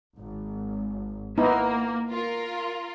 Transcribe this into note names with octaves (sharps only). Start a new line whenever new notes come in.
G#1
A#3 B3 D#4 E4
F4 A#4